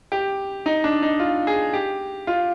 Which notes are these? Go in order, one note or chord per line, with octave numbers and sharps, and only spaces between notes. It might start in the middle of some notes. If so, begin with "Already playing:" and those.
G4
D#4
D4
D#4
F4
G#4
G4
F4